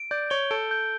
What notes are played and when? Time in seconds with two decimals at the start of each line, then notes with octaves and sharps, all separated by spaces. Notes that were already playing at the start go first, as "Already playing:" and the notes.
Already playing: D7
0.11 D5 G6
0.30 C#5 G7
0.51 A4 D7
0.71 G6